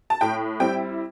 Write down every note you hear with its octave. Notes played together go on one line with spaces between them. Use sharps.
A5
A2 G5
G3 C4 E4 G5